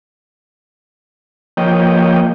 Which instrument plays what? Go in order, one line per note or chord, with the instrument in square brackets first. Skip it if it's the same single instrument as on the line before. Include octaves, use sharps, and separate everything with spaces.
[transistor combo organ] F3 A#3 C#5 D#5 G5